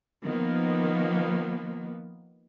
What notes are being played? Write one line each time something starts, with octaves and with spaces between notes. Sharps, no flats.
D#3 F3 A#3 B3